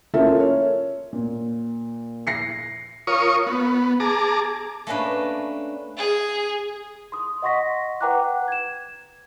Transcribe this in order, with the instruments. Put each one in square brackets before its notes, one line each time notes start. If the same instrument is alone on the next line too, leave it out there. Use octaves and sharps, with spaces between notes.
[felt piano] A#3 C#4 F4 A4 E5
C#5
A#2
A#6 C7 C#7
[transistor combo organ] F4 A#4 C#5 C#6 D#6
B3
G#4 A5 A#5 D6
[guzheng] A3 A#3 C#4 D4 B4
[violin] G#4
[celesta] C6 D#6
D#5 F#5 C6 C#6 A#6 B6
B4 F#5 G5 A#5 D6 F#6
G#6 E7